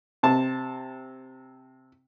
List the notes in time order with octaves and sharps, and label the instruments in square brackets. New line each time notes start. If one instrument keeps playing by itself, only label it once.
[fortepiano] C3 A5